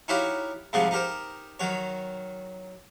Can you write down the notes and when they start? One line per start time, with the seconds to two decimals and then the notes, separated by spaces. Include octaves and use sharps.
0.08 D#4 E4 F#4 G4 C#5 F5
0.73 G#2 C3 F3 G3 G#4 F#5
0.91 D#4 G4 A#4 C5
1.60 D#3 F#3 C#5